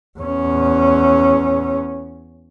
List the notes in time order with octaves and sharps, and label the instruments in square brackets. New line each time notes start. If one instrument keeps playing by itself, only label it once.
[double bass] E2 C#4